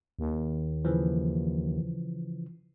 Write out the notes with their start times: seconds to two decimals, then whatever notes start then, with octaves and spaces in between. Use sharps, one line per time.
0.19 D#2
0.85 C#3 E3 F3